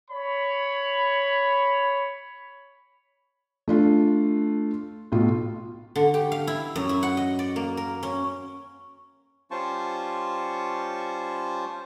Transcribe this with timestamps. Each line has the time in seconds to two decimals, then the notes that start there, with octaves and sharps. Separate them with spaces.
0.11 C#5 B5
3.68 A3 D4 F4
5.12 B1 A2 F4
5.96 D3
6.14 G4
6.32 F5
6.47 E4
6.76 F#2
6.89 E4
7.03 F#5
7.17 D#5
7.39 D5
7.56 A#3
7.77 A#4
8.03 C#4
9.51 G3 C#4 F4 C5 A5 C#6